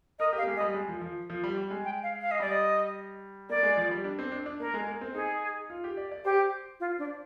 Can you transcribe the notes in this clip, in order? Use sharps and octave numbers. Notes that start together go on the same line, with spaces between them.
A#4 D#5
G4 F5
A#3
G#3
D#5
G3
G#3
F3
F3
F3
G3
G3
G#3
G5
F5
F5
D#5
G3 D5
D#5
A#3 D5
G#3
F3
G3
D4
C4
D4
D4
A#3 A#4
G#3
A#3
C4
D#4 G#4
F4
G4
D5
D5
G4 C5
F4
D4